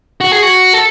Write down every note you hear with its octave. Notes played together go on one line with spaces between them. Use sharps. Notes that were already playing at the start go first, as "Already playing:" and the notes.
F#4
G#4
F#4
A4